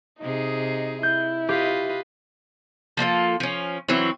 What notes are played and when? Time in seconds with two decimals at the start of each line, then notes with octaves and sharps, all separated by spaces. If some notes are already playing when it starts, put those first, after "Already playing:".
0.21 C3 D#4 G#4
1.03 E4 G6
1.49 F4 G4 B4 D#5
2.97 F3 A#3 F4 A4
3.40 F3 C#4
3.88 E3 F#3 C4 E4